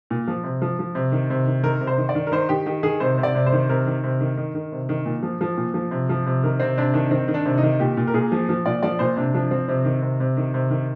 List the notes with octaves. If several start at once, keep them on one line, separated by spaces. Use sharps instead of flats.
A#2
F3
C3
F3
F3
C3
D#3
C3
D#3
D#3 A#4
C3
C5
D#3
D5
D#3
A#4
D#3 C5
D#3 G4
D#3 G4
D#3 G#4
C3 C5
C3
D5
C3
C5
D#3
C3 A#4
D#3
C3
D#3
D#3
D#3
C3
D#3
A#2
F3
F3
A#2
F3
C3
F3
C3
D#3 A#4
C3 C4
C3 D4
D#3 D4
D#3 C4
D#3
D4
C3
D#4
D#3
A#2 G4
A#2
A#4
A#2 G#4
F3
F3
A#2 D5
F3 D5
A#2 C5
C3 D4
F3 D4
F3 C4
C3 C4
D#3
C3
C3
D#3
C3
D#3